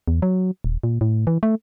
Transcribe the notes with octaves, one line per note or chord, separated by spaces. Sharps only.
E2
F#3
D#1
A#2
A2
E3
A3